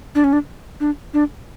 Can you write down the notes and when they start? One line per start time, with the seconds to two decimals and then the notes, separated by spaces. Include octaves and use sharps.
0.15 D4
0.24 C#4
0.33 D4
0.80 D4
1.14 D4